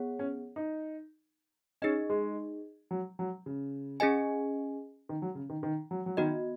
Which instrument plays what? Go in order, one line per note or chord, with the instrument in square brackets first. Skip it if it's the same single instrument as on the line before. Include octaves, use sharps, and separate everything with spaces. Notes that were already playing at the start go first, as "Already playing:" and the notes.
Already playing: [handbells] B3 G#4 C#5 F#5
[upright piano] C#4
D#4
[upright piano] C#4 [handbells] D#4 G#4 D#5
[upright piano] G#3
F#3
F#3
C#3
[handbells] C#4 G#4 D#5 G#5
[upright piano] D#3
F#3
C#3
D#3
D#3
F#3
F#3
[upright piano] D#3 [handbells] B3 F#4 D#5